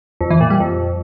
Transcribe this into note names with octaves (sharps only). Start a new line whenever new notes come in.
F2
E3
A#2
G3
F2